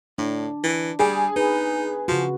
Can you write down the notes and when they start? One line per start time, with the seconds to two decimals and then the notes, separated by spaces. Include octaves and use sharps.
0.18 A2 D4
0.64 E3
0.99 G3 G#4
1.36 D#4 B4
2.08 C#3 F3 F#4